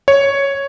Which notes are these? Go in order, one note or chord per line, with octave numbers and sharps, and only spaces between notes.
C#5